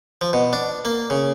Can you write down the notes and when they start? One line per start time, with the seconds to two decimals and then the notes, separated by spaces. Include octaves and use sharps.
0.21 F3
0.33 B2
0.53 D4
0.85 A#3
1.10 C#3